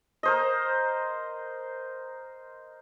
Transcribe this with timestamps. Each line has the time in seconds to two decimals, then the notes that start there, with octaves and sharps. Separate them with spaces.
0.23 A#4 C5 D#5